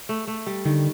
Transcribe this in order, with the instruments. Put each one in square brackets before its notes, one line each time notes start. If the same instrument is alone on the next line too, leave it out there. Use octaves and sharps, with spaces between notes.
[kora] A3
A3
G3
[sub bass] D3 [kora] D#3